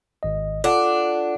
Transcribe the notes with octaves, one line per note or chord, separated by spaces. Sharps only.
G#1 D#5
D4 F4 A4 F#5